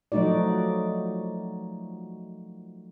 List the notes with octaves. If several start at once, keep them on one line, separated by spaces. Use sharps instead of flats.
F3 F#3 A3 D#4 F#4 D5